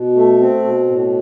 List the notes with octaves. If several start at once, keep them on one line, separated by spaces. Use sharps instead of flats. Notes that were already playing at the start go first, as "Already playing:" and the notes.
Already playing: B2
A3
C4
B2
A2